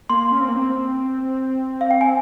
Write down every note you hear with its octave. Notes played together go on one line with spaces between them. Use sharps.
A#3 C6
C#4
C4
A#3
C4
F5
G5
G#5